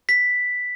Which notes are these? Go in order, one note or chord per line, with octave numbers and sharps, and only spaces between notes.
B6